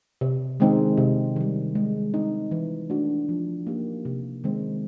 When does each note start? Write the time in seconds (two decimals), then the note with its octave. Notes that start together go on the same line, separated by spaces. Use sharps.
0.21 C3
0.60 D#3 G#3 C4 D#4
0.97 C3
1.36 D#3 G3
1.75 G#3
2.14 C4 D#4
2.51 E3
2.90 A3 D4 F#4
3.29 F3
3.67 A#3 D#4 G4
4.05 C3
4.44 D#3 G#3 C4